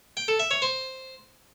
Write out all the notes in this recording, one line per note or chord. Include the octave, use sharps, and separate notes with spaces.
G5
A4
E5
C#5
C5